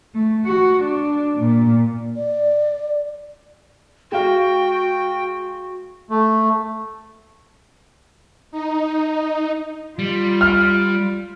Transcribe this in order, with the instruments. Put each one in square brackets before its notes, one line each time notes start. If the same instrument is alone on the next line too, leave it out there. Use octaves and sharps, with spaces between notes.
[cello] A3
F#4
D4
A#2
[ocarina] D5
[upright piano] G#3 F5 [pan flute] F#4 [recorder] G5
[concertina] A3
[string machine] D#4
[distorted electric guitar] G3 [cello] F4
[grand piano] F6